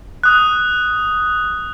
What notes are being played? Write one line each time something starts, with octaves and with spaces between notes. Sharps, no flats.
D#6 F#6